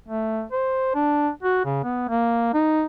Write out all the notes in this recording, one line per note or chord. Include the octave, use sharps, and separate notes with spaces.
A3
C5
D4
F#4
C#3
B3
A#3
D#4